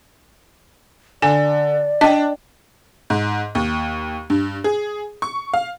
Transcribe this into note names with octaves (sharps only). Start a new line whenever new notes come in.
D3 D5 G#5
D4 D#5 G5
G#2
D#2
G2
G#4
C#6
F5